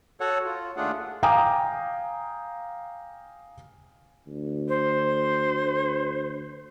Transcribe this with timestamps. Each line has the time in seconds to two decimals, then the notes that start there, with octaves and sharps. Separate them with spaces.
0.20 F#4 A4 C#5 F#5
0.45 F4
0.77 D#2 A3 D4 F4 G#4 F#5
1.23 F5 G5 G#5 A#5 D6 D#6
4.27 D2
4.68 C5